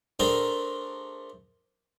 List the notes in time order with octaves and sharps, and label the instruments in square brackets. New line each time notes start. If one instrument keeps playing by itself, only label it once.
[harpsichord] A3 C4 D4 G#4 A#4 G5